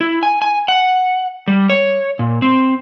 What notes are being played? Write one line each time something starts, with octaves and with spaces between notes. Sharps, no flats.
E4
G#5
G#5
F#5
G3
C#5
A#2
C4